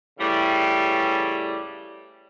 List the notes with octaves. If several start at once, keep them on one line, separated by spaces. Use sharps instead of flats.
A2 C#3 E3 G3